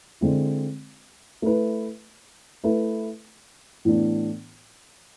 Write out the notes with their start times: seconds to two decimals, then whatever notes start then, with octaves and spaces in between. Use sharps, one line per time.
0.21 D3 G#3 C4 E4
1.42 A3 E4 B4
2.64 A3 E4 B4
3.85 A2 E3 B3 D4